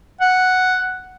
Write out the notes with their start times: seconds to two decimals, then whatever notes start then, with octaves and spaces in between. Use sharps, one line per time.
0.21 F#5